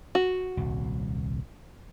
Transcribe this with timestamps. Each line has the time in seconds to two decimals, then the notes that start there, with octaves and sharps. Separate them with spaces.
0.15 F#4
0.57 D#1 C2